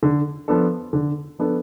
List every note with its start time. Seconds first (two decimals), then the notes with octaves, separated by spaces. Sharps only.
0.03 D3
0.48 F3 B3 D4 A4
0.93 D3
1.39 F3 B3 D4 A4